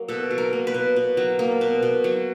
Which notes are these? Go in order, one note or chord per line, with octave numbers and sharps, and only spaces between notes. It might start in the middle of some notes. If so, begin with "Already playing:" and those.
Already playing: F#3 A#3
B2 A4
F#3
A#4
A#3
B4
B2
B2
F#3
A#3
B2
B2
F#3